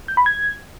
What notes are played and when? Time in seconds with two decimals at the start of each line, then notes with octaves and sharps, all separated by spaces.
0.08 G6
0.17 B5
0.26 G#6